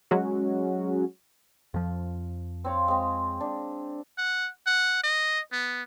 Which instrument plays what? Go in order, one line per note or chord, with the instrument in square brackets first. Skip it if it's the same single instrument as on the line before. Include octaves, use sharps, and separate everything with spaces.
[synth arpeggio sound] F#3 G#3 C#4 F#4
[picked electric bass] F2 F3
[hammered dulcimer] C4 C#5 F5
G#3 C4
D4
[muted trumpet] F#5
F#5
D#5
B3